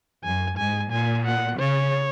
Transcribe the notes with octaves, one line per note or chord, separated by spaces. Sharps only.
F#2 G#5
G#2 G#5
A#2 G#5
F#5
C#3 C#5